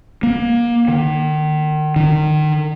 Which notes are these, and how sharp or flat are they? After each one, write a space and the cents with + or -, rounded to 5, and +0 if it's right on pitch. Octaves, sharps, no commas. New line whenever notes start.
A#3 +25
D#3 -30
D#3 -30